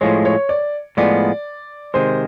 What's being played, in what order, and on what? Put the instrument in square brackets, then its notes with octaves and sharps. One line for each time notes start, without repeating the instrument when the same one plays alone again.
[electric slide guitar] A2 F3 G#3 [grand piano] C#5
[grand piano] C#5
D5
[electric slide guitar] A2 F3 G#3 B3 [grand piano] D5
[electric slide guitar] C3 D#3 G#3 [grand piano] C5